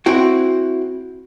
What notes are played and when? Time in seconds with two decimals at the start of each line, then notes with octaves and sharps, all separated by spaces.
0.06 C4 E4 F#4 G5